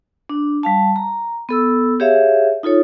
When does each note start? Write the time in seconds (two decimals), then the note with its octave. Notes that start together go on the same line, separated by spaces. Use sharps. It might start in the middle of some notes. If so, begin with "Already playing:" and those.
0.29 D4
0.63 G3 F5 A5
0.96 A#5
1.49 B3 A4 E6
2.00 G4 G#4 C#5 E5 F5
2.63 D#4 F4 A4 C#5